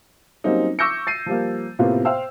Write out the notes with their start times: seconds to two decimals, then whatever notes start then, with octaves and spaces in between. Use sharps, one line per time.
0.44 F#3 G3 A#3 C4 C#4 D#4
0.79 C#6 D6 E6 G6 A#6 C#7
1.07 A6 C7 D#7
1.26 F3 G3 A#3
1.79 A2 C3 A#3 B3 F4
2.05 C5 F5 G5 E6